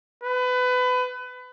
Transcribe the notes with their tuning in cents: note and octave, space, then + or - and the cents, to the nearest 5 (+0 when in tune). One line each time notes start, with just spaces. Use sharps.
B4 +25